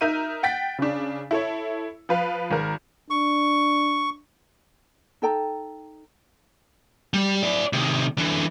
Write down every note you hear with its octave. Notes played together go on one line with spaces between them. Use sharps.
D#4 A#4 E5 G6 D#7
F#5 G5 A6 B6
C#3 D4
E4 A4 C#5
F3 B4 F5
G#1 A#4
D4 C#6
D#4 A4 G5 A#5
G3 G4
E4 D5
C3 D#3
D3 E3